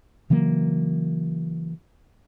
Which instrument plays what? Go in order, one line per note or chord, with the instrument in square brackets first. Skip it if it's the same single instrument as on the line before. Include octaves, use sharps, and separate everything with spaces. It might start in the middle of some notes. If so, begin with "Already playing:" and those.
[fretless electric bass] C#3 E3 F#3 A#3